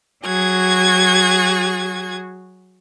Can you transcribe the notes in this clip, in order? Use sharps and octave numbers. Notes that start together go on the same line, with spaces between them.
F#3 F#4 G#4 G#6